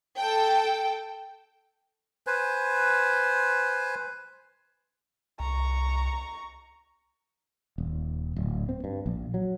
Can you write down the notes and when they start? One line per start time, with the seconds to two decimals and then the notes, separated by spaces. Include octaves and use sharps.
0.17 A4 G5
2.27 B4 C5 G#5
5.40 C2 A#5 C#6
7.78 D#1
8.36 D1
8.69 C4
8.84 G2
9.06 A#1
9.34 F#3